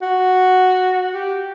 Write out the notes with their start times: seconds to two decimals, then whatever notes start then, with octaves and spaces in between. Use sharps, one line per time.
0.02 F#4
1.14 G4